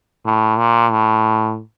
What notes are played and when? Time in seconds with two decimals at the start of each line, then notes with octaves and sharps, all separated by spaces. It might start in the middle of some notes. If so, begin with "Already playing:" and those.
0.25 A2
0.58 A#2
0.91 A2